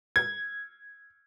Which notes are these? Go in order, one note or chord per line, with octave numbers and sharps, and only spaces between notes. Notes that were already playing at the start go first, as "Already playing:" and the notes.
G#6